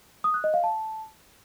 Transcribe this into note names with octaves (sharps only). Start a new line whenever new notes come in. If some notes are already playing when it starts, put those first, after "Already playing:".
D#6
F#6
D#5
F5
A5